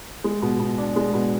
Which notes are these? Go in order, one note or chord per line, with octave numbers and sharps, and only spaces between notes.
G#3
B2
B2
D4
G#3
B2